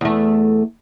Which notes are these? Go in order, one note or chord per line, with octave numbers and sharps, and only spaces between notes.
E2 A3